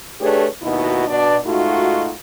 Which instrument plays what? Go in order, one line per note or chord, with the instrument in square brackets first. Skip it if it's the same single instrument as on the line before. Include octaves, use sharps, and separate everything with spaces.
[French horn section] A3 D4 G4 G#4 B4 C#5
D#2 B2 D#4 E4 F#4 D#5
B2 D4 D5
G#2 A3 D#4 F4 F#4